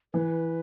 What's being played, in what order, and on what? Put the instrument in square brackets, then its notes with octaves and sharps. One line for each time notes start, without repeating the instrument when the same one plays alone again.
[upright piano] E3 [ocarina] B4